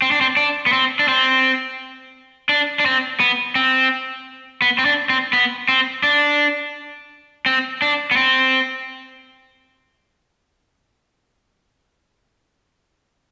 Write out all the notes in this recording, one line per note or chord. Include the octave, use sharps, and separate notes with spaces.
C4
D4
C4
D4
B3
C4
D4
C4
D4
D4
C4
B3
C4
B3
C4
D4
C4
B3
C4
D4
C4
D4
B3
C4